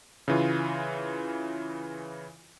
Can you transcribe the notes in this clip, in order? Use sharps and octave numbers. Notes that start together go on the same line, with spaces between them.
C#3 E3 F4